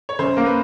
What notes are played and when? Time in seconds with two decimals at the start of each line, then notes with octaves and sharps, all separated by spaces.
0.09 C#5
0.19 F#2 C5
0.37 A#3 A#4
0.46 B4